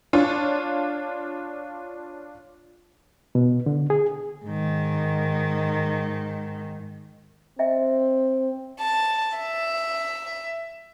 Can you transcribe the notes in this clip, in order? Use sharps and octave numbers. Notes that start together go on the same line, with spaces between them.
D4 F4 C#5
B2
D3
G#4
G#2 D#3
C4 D#5 E5 G5
A5
E5